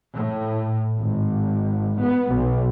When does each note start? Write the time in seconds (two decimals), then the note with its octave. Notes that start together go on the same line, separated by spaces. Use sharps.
0.17 A2
1.01 G#1
2.02 B3
2.33 B1